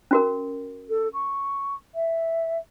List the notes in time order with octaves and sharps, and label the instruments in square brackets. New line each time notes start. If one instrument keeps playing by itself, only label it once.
[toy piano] C#4 F#4 A#4
[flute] A4
C#6
E5